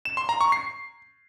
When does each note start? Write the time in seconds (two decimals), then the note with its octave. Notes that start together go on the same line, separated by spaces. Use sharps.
0.05 E7
0.17 C6
0.29 A#5
0.41 C#6
0.52 C7